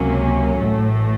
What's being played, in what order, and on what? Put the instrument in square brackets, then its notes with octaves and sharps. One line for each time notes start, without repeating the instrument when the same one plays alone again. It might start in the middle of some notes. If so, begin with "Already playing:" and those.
Already playing: [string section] C#2 C3 F#3 A#3 C#4
A1 A2 A3